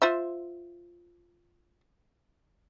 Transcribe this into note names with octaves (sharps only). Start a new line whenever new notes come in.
F4 C5 E5